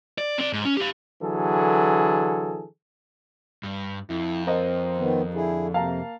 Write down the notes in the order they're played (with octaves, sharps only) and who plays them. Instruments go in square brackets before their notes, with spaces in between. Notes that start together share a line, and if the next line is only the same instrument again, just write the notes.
[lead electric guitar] D5
C4 D5
G#2
C#4
G4 F5
[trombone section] D3 E3 F#3 G#4 A4
[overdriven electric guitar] G2
[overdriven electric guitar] F2 [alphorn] E4
[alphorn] C4 [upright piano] A#4 C5 D#5
[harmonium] D#3 B3
[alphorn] D3 [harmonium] E4 G#4
[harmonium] C3 [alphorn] A#3 [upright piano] F5 A5 A#5